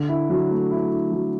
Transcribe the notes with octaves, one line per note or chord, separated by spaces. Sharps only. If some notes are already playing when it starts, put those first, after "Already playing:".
Already playing: D3
E4
F#3
A3
E4
E4
F#3